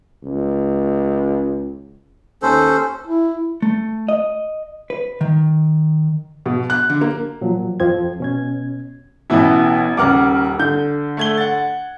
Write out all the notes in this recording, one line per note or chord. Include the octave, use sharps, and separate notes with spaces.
C#2
D#2 C#4 A4 C5
E4
A3
D#5
B4
D#3
B2
F#6
D3
A#3
A#2 F3 F#3
F2 F3 C4 G#6
B2 C#4 G#6
A1 B2 E3 B3 E4
D#1 C#3 A#4 F#5 D6 F6
D3 G6
A3 G#6 G7
F#5 A6